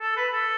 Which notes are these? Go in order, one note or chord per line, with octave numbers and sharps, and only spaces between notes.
A4
B4
A4